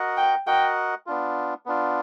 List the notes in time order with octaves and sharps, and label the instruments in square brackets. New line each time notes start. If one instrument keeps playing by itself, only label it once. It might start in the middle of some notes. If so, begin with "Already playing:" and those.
Already playing: [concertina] F#4 A#4 D#5 F#5
[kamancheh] G5
[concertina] F#4 A#4 D#5 F#5 [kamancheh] G5
[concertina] B3 D4 F4
B3 D4 F4